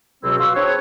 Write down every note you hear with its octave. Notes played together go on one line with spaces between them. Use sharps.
C#2 B2 F#3 C4 E4 E6
F4 F#4 B4 C6 E6
C4 D4 G#4 B4 C#5